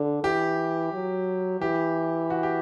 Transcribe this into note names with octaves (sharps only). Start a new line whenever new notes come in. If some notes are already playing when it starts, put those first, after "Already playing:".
Already playing: D3
E3 G4
F#3
E3 G4
F#4
G4